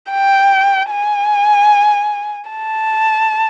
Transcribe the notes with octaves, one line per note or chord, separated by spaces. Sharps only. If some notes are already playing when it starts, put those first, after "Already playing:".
G5
G#5
A5